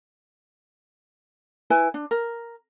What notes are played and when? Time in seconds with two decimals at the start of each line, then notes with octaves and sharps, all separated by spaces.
1.70 E4 B4 G#5
1.94 D4
2.11 A#4